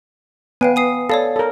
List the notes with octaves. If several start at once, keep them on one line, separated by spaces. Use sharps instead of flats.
B3 F5 G5 G#5
G#5 D#6 C7
A4 C#5 D5 F5
A4 A#4